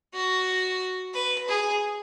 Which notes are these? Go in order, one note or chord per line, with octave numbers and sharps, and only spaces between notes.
F#4
B4
G#4